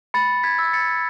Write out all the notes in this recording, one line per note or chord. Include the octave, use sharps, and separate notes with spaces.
B5 A6 C#7
G#6 B6
E6
A6 C#7